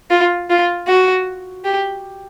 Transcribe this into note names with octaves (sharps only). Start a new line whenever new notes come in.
F4
F4
F#4
G4